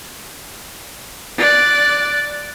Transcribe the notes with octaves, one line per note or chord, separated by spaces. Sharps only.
D5 F#6